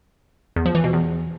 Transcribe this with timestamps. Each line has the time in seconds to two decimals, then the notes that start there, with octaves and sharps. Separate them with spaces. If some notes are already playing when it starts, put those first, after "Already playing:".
0.56 E2
0.66 F3
0.75 E3
0.84 B2
0.93 E2